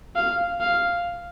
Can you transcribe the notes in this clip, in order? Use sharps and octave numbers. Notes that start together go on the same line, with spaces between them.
F5
F5